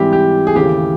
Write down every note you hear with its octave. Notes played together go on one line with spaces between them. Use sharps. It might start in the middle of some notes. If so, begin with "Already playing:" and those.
Already playing: G#2 E3 G3 C4 E4 G4
G4
G#4
D#2 C#3 E3 A3 G4